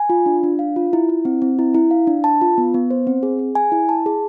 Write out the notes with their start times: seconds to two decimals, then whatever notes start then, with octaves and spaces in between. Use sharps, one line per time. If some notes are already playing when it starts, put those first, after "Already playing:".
Already playing: G#5
0.10 F4
0.26 D4
0.43 D4
0.59 F5
0.76 F4
0.93 E4
1.09 E4
1.25 C4
1.42 C4
1.59 E4
1.74 E4
1.91 F5
2.07 D4
2.24 A5
2.41 F4
2.58 B3
2.74 B3
2.90 C5
3.07 C4
3.23 G#4
3.39 G#4
3.55 G#5
3.72 E4
3.89 A5
4.06 G#4